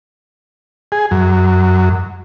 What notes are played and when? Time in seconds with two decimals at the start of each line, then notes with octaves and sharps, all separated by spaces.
0.92 G#4
1.11 F#2